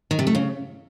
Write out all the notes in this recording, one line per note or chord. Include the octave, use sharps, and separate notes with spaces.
D#3
C3
A3
C#3